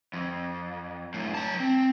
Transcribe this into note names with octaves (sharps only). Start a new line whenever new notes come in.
F2
F#2 A2
F#3 A5
C4